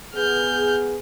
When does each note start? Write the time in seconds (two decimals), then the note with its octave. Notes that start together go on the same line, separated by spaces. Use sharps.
0.15 B3 G#4 F6 G6